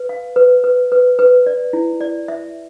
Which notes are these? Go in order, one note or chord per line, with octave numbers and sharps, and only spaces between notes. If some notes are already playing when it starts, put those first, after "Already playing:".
Already playing: B4
F5
B4
B4
B4
B4
D5
E4
D5
E5